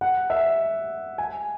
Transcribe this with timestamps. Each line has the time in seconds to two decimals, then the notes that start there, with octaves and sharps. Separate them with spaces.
0.01 F#5
0.30 E5
1.18 G#5